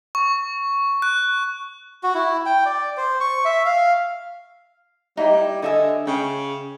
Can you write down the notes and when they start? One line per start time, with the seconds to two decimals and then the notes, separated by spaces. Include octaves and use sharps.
0.15 C#6
1.02 F#6
2.04 F#4
2.15 E4
2.46 G5
2.65 D5
2.97 C5
3.20 C#6
3.45 E5
3.66 F5
5.17 G3 D#4 E4 G5
5.38 E4
5.62 D3 D#5 E5 G#5
6.07 C#3 G5